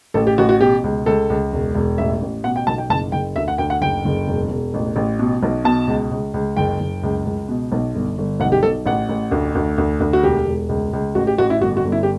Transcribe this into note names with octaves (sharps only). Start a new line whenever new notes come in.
A1 A4
G4
A1 F#4
F#4
B2 G4
C#2
C#2 A4
C#2
E1
E1
A1 E5
A1
B2 F#5
G5
B1 A5
G5
F#1 A5
F#1 G5
D2 E5
F#5
D2 G5
F#5
F#1 G5
F#1
E1
E1
A1
A1
B2
B1
B2 A5
C#2
C#2
C#2
F#1 G5
F#1
C#2
C#2
B2
B1
G1
G1
B1 F#5
G4
B1 A4
A1 F#5
A1
D2
D2
D2
D2
F#4
E1 G4
E1
C#2
C#2
A1 F#4
G4
A1 F#4
E4
G1 F#4
F#4
G1
E4
G4